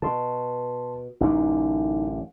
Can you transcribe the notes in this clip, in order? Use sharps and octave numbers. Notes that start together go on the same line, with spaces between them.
B2 A5 C6
A1 F#2 D3 D#4